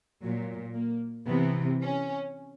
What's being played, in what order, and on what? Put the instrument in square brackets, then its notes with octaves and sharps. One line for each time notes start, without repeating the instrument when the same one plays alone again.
[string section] A#2 F#3
A#3
C3 E3 B3
C#4